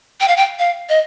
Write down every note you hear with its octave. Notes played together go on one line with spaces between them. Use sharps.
G5
F5
G5
F5
D#5